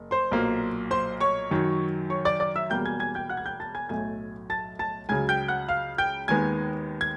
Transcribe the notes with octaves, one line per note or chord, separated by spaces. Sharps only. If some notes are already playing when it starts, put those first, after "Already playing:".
Already playing: F#1
C5 C6
B1 A#2 F#3 A#3
C5 C6
C#5 C#6
F#2 D#3 F#3
C#5 C#6
D5 D6
D5 D6
E5 E6
E1 E2 B2 G3 A#3 G5 G6
G#5 G#6
G#5 G#6
G5 G6
F#5 F#6
G#6
G5 G6
A5 A6
G#5 G#6
B1 A2 F#3 A3 G#5 G#6
A5 A6
A5 A6
C#2 C#3 F#3 G#5 G#6
G5 G6
F#5 F#6
F5 F6
G5 G6
D#2 D#3 G#3 B3 G#5 G#6
G#6